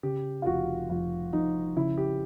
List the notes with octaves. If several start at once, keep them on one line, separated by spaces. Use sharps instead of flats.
C#3 G4
F4
F1 F#4
F2 F4
F2 D#4
C#3 E4
G4